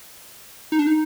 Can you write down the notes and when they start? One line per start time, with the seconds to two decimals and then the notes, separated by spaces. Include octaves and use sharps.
0.72 D#4
0.79 D4
0.87 D#4